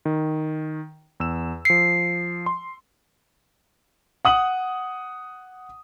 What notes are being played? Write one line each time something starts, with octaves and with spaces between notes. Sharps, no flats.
D#3
E2 E6 E7
F3 C7 C#7
C6
F#5 D#6 F#7